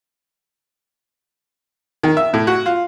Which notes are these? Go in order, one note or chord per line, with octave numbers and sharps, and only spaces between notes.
D#3
E5
A2
F#4
F4